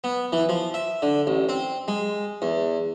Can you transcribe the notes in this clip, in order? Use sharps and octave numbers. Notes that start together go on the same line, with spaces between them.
B3
E3
F3
E5
D3
A1
C4
G#3
E2